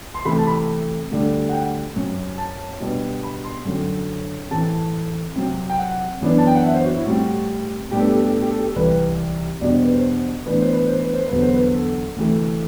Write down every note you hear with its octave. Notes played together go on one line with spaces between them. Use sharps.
C6
C3 E3 A3 C4 B5
A5
B5
D2 D3 G3 D4
F#5
G5
F#2 F#3 C4
A5
B2 G3 B3 D4
B5
C6
F#2 D3 F#3 C4
A2 E3 A3 C4 A5
C3 F#3 C4
G5
F#5
F#2 E3 B3 D4
A5
G5
F#5
E5
C5
F#4
E4
A2 G3 C4 F#4
A2 G3 B3 D4 G4
A4
G4
A4
G4
A4
G4
A4
G4
A4
C2 C3 E3 G3 B4
E2 B2 G3 D4 D5
C5
B4
C5
A2 E3 B3 D4 B4
C5
B4
C5
B4
C5
E2 D3 F#3 B4
C5
B4
A4
D2 C3 E3 A3